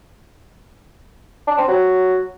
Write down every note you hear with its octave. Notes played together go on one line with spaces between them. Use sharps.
D4
C4
F#3